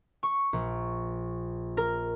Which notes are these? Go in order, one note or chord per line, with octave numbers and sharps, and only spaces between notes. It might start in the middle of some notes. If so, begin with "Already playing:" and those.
C#6
A#1
A#4